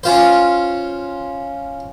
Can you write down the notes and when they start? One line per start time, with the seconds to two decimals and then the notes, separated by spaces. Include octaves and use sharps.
0.03 C#4 F4 C5